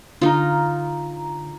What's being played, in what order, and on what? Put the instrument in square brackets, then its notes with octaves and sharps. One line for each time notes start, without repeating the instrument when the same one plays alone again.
[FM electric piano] D3 A#5 [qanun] D#4 F4